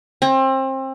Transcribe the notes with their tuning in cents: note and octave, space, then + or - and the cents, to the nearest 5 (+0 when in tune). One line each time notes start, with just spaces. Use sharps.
C4 +30